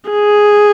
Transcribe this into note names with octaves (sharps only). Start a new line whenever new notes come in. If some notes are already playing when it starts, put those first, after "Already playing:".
G#4